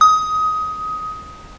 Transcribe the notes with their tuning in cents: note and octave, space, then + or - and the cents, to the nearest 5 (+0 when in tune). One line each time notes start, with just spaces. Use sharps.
D#6 +15